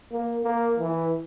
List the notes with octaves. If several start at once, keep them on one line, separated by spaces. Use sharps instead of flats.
A#3
A#3
E3